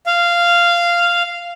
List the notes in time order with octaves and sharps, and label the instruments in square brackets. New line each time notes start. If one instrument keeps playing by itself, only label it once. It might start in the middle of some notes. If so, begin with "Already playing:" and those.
[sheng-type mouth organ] F5